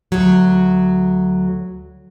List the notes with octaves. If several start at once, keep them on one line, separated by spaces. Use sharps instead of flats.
D2 F#3